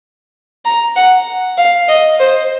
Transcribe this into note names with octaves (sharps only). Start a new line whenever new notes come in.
A#5
F#5
F5
D#5
C5